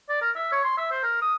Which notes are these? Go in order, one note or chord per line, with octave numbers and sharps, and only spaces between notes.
D5
A#4
E5
C#5
C6
E5
C5
A#4
D#6